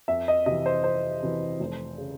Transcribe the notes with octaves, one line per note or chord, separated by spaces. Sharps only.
F2 E5
D#5
C3 E3 D#5
C5
F2 C5
C3 E3
F1
C#3